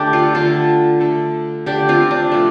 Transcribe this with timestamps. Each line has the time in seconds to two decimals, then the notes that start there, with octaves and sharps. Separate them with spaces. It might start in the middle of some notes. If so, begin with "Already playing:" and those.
Already playing: D3 A3 D4 G4
0.13 F4 A4
0.34 D3 A3 F4 A4
1.00 D3 A3
1.66 D3 A3 D4 G4
1.89 C4 F4
2.11 D4
2.32 C3 F3 A3